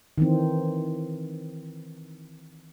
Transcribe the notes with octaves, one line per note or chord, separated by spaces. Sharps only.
D#3 E3 C4